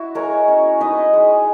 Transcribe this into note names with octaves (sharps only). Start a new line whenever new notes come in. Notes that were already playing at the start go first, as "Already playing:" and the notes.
Already playing: E4 F#4
G#3 A#4 C#5
C#4
D#4 B4 D#5
G#3